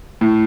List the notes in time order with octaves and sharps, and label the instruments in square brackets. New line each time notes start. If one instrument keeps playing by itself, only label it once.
[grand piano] A2